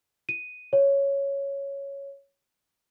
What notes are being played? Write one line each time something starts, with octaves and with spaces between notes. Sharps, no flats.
D#7
C#5